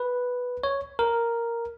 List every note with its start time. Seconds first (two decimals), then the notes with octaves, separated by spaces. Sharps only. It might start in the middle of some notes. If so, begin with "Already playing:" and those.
Already playing: B4
0.64 C#5
0.99 A#4